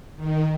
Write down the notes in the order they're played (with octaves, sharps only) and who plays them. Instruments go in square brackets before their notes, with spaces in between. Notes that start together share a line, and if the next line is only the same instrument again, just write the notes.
[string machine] D#3